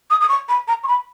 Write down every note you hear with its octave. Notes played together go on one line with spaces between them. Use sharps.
D#6
D#6
C#6
B5
A#5
C#6
B5